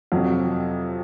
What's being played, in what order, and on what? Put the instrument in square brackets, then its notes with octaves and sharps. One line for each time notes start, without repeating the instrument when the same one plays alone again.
[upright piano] F2 C3 F#3